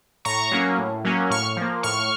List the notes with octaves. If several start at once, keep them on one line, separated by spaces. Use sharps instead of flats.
A2 A#5 C#6
F#3 A#3 C#4
A2
F#3 A#3 C#4
A2 C#6 F6
F3 A#3
A2 C#6 F6